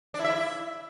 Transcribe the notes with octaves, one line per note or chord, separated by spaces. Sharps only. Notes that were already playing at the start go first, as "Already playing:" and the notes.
D4
E4
E5
E4